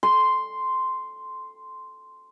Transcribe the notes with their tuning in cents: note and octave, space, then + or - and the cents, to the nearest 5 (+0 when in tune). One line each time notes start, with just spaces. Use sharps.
C6 -5